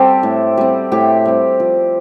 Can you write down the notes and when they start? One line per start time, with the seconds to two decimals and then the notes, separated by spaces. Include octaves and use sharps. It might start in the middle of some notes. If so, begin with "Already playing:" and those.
Already playing: G3 C4 G4 A4
0.23 A2
0.57 G3 C4
0.92 A2 G4
1.25 G3 C4
1.60 F3